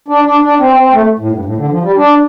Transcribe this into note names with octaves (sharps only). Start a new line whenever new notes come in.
D4
D4
D4
C4
C4
A3
A2
G2
A2
D3
F3
G3
D4